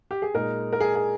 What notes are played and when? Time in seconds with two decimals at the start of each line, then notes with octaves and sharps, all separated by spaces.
0.11 G4
0.22 G#4
0.34 A#2 G#3 D#4 A#4
0.73 A#4
0.80 G#4
0.95 G#4